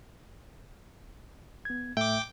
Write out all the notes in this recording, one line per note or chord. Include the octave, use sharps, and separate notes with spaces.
B3 G#6
A2 A3 E5 G5 D6